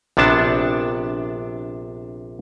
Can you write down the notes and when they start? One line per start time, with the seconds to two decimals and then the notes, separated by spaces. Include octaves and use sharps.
0.17 A#1 C3 B3 D4 A5